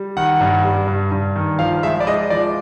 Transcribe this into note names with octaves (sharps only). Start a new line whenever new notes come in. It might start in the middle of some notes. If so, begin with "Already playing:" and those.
Already playing: G3
D#3 F#5
G2
G3
G2
G2
D#3
F3 F5
G#3 E5
D5
G#3 D#5
F3 D5